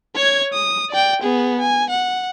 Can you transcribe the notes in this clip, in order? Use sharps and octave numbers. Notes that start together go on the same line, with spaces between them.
C#5 G#6
D#6
D5 G5
B3 G#4
G#5
F#5